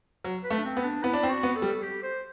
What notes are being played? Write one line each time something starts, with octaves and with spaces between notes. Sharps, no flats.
F#3
B4
A3
D4
C4
B3
D4
B3 E4
D4
C4 E4
F#4
B3
A4
G3
G4
C5